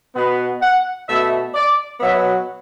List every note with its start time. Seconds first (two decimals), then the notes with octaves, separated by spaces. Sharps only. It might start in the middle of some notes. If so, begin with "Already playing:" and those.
0.15 B2 B3
0.62 F#5
1.08 B2 A3 E5
1.54 D5
2.00 B2 F#3 B3 E5